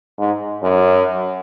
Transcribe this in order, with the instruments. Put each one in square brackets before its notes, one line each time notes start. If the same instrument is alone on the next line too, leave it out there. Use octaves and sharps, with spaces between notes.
[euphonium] G#2
F#2